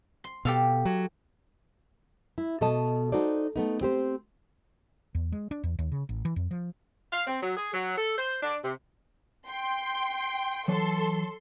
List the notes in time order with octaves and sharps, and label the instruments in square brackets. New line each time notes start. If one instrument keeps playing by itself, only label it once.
[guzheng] C6
[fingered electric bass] B2 [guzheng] G4 A4 F5
[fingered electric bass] F#3
[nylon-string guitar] E4
B2 A4 D#5 A5
D#4 F#4 A4 C5 D5
A3 B3 D#4
C4 G4 C5
[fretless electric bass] E2
G#3
D4
E2
D#2
C#3
A1
E3
F2
F3
[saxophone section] F5
C4
F#3
G#4
F#3
A4
C5
D4
C3
[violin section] G5 C6
[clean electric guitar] E3 F#3 C#5 [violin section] A4 C6